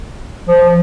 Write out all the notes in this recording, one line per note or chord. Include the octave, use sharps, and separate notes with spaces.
F3